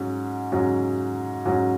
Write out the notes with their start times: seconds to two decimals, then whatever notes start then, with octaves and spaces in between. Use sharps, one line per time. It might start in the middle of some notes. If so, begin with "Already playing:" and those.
Already playing: G#2 F#3 C#4
0.52 G#2 F#3 C#4
1.45 G#2 F#3 C#4